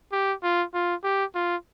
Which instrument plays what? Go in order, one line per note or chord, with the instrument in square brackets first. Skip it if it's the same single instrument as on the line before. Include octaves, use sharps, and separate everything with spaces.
[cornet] G4
F4
F4
G4
F4